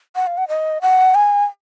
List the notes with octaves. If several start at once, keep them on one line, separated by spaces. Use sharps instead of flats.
F#5
F5
F#5
D#5
F#5
G#5